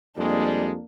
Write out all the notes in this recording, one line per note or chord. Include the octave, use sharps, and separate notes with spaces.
F2 G3 G#3 A#3 D4